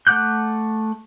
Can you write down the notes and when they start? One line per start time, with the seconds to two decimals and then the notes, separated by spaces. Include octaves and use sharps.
0.07 A3 F#5 D6 F#6 G6